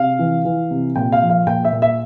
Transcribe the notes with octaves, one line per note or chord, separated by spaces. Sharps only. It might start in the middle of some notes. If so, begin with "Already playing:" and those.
Already playing: C3 F5
E3
E3
C3
A#2 G5
F5
F3
F5
A#2 G5
E5
A#2
E5